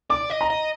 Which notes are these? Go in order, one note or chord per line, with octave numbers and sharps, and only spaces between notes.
D5 D6
D#5
A#5
D#5